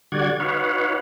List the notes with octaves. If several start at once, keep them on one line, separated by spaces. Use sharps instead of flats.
D3 G3 F#4 D5 F#5 G#6
D#4 F#4 B4 C#5 F5 F#5